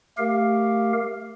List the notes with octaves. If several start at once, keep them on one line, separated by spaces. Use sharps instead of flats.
A3 G4 A#4 F5